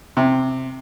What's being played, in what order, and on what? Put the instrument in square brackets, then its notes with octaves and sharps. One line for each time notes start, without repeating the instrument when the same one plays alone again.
[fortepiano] C3